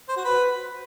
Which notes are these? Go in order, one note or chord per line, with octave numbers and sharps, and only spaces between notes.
C5
F#4
B4